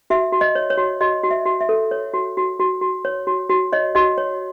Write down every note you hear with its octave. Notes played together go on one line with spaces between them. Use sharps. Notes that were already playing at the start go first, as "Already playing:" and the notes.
F#4 E5
F#4
D#5
C#5
C#5
F#4
F#4 D#5
F#4
E5
F#4
E5
A4
C#5
F#4
F#4
F#4
F#4
C#5
F#4
F#4
C#5 D#5
F#4 D#5
C#5